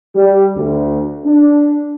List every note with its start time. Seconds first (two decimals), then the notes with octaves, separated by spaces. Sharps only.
0.15 G3
0.57 D2
1.25 D4